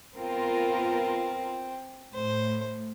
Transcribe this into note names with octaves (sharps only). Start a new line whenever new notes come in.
B3 C4 F4 A#4
A2 C5